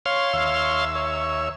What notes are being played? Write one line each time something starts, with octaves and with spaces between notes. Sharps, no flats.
C#5 F5 C6
D#2 E5 E6
C#5